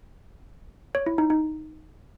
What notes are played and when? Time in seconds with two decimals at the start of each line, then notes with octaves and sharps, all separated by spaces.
0.95 C#5
1.06 E4
1.18 D#4
1.30 D#4